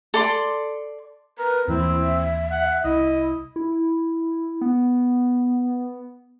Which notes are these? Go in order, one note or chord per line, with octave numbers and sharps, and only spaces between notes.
A4 D5 C6
A#4 B4
D#2 E3 A#3 C4 E4
E5
F#5
C2 E4 D#5
E4
B3